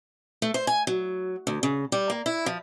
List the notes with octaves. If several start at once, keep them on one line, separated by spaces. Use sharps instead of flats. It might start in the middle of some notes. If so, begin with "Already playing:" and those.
A3
C5
G#5
F#3
D2
C#3
G3
A#3
E4
F3